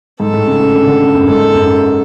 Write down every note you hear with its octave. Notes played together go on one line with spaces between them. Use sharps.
G#2 A4
A2
C#3
A2
D3
D3
C#3
F#2
A2
G#2 A4
F#2